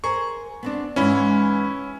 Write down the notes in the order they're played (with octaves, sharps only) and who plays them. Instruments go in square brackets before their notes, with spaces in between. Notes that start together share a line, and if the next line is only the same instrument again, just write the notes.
[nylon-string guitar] G#4 A#4 C5 [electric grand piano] C#6
[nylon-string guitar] B3 C4 D4
[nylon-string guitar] G#2 E3 G#3 [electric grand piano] C#4 E4 [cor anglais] B4